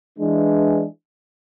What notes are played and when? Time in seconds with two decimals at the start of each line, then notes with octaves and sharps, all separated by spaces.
0.18 E3 G#3 D4